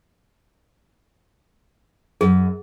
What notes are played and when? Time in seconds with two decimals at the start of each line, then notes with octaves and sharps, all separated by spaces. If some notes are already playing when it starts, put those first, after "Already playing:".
2.21 F#2 G#4